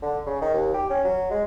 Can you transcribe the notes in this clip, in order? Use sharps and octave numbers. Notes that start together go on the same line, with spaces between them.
D3
C#3
D#3
D#2
G4
C#4
F#3
G#3